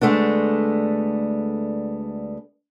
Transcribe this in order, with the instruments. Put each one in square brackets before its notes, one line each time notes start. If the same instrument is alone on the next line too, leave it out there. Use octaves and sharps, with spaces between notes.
[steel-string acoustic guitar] D2 G#3 A3 B3 D4